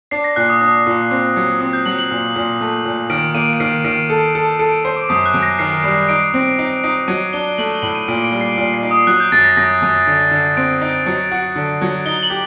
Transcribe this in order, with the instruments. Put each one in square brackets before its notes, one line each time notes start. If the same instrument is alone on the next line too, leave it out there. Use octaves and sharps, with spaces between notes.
[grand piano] D4 [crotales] C7
[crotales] A#6
[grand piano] A#2 [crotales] F#6
[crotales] D#6
[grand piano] D4 [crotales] D#6
[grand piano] A#2
C4
F#3
[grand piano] C4 [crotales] D#6
[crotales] G6
[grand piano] F#3 [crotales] F#7
[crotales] F#7
[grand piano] A#2
A#2
A3
A#2
[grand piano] D#3 [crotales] D7
[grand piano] A#3 [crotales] D#7
[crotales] D7
[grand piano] D#3 [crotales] C7
[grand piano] D#3
A4
A4
[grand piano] A4 [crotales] D7
[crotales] D7
[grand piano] C5 [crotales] C7
[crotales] D6
[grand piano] F#2 [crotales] D#6
[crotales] F#6
[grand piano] F#2
[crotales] A#6
[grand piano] D#3 [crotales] C7
[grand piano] G3
[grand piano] D#4 [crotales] D7
[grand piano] C4
D#4
D#4
[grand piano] F#3 [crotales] D#7
[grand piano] D4 [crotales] G7
[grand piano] A3 [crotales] F#7
[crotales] G7
[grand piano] A2 [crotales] F#7
[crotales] D#7
[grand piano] A#2 [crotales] D7
[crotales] D7
[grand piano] G3
[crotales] C7
[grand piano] A#2
[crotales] C7
[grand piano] D#4
[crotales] D#6
[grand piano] F#3 [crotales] F#6
[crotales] G6
[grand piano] F#2 [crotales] A6
[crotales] A#6
[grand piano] F#2 [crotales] A#6
[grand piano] F#2
D3
D3
[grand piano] C4 [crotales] D7
[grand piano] D#4
F#3
F#4
D3
F#3
[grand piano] D#4 [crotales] G7
[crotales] F#7
[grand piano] G4